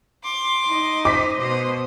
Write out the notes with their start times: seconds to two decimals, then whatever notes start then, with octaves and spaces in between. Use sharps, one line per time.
0.24 C6 D6
0.67 D#4 D#5
1.05 C5 D6 B6
1.40 B2 C5 D#5